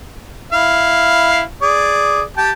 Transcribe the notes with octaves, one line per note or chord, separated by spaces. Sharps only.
E4 F5
G#4 D5
G4 G5 A5